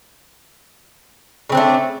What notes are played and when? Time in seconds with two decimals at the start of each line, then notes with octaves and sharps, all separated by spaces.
1.49 C#3
1.52 C4
1.55 D4
1.57 A3